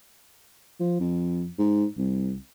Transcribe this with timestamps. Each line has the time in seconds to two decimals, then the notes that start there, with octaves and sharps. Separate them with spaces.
0.80 F3
1.00 F2
1.59 G#2
1.98 C2